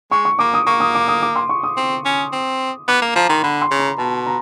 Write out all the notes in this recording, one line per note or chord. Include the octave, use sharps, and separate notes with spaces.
G#3 C#6
C#6
A#3 D6
D#6
A#3 C#6
D#6
D6
D#6
D6
C6
C#6
D#6
C4
C#4
C4
B3 D6
A#3
F3 A#5
D#3 C6
D3 B5
C6
C#3
A#5
B2 A5
A#5